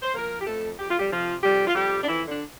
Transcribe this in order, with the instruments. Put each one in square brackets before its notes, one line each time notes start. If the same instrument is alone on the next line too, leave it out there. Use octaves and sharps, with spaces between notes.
[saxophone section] C5
F3 A#3 A#4
G4
F2 A3 A4
F2 G4
F4
G3 G4
C3 F3 F4
F2 G3 G4
F4
F2 G3 G4
D4
F2 E3 E4
D3 D4